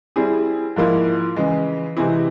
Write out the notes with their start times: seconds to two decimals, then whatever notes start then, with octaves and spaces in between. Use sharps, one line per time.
0.16 G3 C4 E4 G#4
0.76 G#2 F3 A#3 E4
1.36 C#3 E3 G#3
1.97 C3 E3 G#3 C4 E4